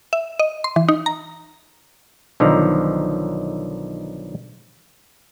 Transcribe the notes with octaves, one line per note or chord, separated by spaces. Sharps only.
E5
D#5
C6
E3
D#4
A#5
B1 D3 D#3 F3 A#5